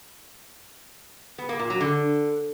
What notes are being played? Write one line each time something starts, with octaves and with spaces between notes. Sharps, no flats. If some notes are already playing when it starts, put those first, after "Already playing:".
B3
A#3
A#2
F#3
D3